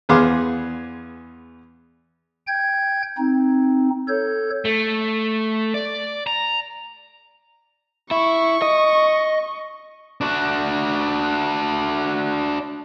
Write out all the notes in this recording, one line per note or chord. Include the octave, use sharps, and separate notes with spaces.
E2 B3 G#4 F5 C6 D6
G5 G6 G#6
C4 D#4
A4 C#5 G6
A3
D5
A#5
E4 C#6
D#5
D4 F#4